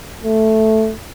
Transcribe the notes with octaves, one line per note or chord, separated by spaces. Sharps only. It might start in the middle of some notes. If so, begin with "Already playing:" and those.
A3